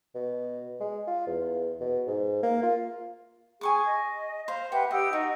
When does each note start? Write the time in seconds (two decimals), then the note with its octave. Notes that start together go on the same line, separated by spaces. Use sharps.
0.15 B2
0.80 G#3
1.07 F4
1.27 E2
1.81 B2
2.07 G#2
2.43 A#3
2.63 F4
3.61 G#4 G#5 C#6 D6
3.86 D#5
4.48 C5 F5
4.72 G4 B4 E5 F#5
4.91 G4 D#5 F#5 E6
5.13 D#4 F#4 D#5